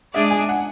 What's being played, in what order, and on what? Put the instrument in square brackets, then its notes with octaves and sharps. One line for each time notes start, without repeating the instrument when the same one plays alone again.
[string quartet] G#3 D4 G#4 D5 [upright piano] E5
[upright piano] G#5
F#5